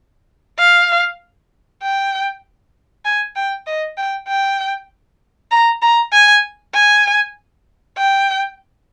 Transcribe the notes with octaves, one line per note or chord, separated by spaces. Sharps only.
F5
G5
G#5
G5
D#5
G5
G5
A#5
A#5
G#5
G#5
G5